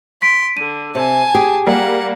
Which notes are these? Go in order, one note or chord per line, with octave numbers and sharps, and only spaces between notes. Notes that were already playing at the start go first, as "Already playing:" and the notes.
C6 B6 D7
D3 D#7
C3 G#5 A5
G4 G#4
G3 A#3 F#5